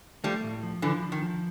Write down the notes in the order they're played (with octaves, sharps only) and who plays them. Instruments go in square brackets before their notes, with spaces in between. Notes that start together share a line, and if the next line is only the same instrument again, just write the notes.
[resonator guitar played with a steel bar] F3 G3 [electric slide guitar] A3
[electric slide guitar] A2
F3
[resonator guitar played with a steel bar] D3 E3 [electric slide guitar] F3
[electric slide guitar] F3
[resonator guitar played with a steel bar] D#3
[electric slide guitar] F3